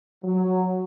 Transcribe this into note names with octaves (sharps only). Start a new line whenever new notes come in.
F#3